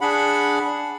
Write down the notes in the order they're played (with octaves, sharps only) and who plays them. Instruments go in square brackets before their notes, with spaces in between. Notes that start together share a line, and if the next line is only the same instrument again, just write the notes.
[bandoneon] D4 G#4 F#5 B5